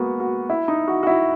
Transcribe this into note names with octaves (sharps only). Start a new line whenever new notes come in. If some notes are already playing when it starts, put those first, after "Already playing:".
Already playing: G#3 A#3 B3 F#4
F#4
E4
D#4
F#4
F#4
E4